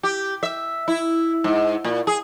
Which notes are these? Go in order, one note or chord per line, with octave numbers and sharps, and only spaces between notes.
G4
E5
E4
G#2
A#2
G#4